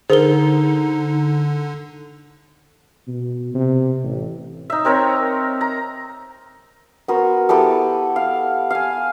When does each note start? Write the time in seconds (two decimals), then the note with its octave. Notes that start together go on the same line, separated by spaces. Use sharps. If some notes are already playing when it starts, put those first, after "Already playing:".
0.10 D3 D#4 G#4 A#4 C5 G7
3.08 B2
3.54 C3
4.04 A1
4.70 D#4 E5
4.85 C4 A#4 C#5 A#5
5.61 A#5
7.08 B3 F#4 A#4 C5
7.49 B3 E4 G4 A4
8.16 F5
8.71 F5 G#5